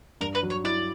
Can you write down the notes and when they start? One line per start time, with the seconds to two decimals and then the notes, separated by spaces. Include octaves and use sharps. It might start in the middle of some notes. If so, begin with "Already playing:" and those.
0.21 G2 A#4
0.35 B4
0.43 F#3
0.50 C#5
0.64 E4 D5